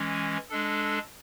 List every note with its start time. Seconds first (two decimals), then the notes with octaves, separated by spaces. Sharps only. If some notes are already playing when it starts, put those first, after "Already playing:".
Already playing: E3 G#3 C#4
0.49 G#3 D4 A4